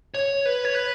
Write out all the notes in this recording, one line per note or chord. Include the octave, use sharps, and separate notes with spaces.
C#5
B4
C#5
B4